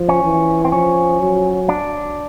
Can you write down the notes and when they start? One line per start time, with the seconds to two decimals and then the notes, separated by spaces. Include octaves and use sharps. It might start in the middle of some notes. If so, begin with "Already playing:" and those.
Already playing: F3
0.08 C#4
0.24 E3
0.65 C4
0.72 F3 C#4
1.21 F#3
1.69 D4